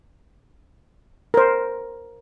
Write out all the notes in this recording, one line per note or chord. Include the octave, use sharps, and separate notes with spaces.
A#4 C5